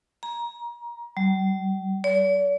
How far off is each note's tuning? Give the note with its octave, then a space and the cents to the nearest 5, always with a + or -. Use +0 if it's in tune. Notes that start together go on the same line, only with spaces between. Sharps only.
A#5 +25
G3 -45
D5 -45